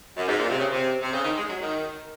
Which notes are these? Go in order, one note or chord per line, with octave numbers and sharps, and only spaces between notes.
F#2
G#2
A#2
C3
C#3
C3
C3
C#3
D#3
G#3
F#3
D#3